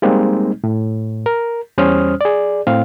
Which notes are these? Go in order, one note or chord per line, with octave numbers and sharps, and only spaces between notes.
G3 G#3 A#3 C4 D#4
A2
A#4
E2 G3 C#4 C5 D#6 F6
G#4 D5
A2 C4 F5